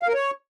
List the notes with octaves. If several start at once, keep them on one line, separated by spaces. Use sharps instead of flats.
F5
A#4
C#5